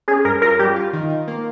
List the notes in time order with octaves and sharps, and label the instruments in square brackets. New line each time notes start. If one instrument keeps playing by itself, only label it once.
[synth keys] C#4 [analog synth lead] G#4
[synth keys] G2 [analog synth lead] A#4
[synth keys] F4 [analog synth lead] A#4
[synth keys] G3 [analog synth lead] G4
[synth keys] F4
D#3
D#3
A#3